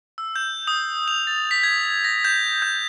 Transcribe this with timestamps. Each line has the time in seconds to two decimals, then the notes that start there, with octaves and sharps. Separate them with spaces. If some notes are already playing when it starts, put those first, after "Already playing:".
0.18 E6
0.36 G6
0.67 D#6
1.08 F7
1.27 A6
1.51 B6
1.63 G#6
2.04 A#6
2.24 G6
2.62 G6